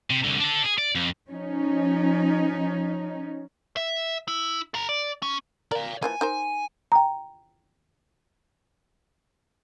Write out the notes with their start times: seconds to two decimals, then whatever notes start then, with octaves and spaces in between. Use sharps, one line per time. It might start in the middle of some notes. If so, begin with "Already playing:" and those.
0.10 C3
0.24 C2 D3
0.40 D4 A4
0.64 G#4
0.78 D5
0.95 F2
1.30 F3 C#4 D#4
3.77 E5
4.28 E4
4.74 A4 A#5
4.89 D5
5.23 C#4
5.71 A#4 D5 F5
6.03 E3 F3 A#3 G#5
6.21 D#4 A#4 C5
6.92 G5 A#5